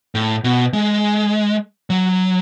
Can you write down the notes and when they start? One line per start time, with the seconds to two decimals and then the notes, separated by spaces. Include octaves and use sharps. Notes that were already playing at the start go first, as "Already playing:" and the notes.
0.15 A2
0.44 B2
0.73 G#3
1.90 F#3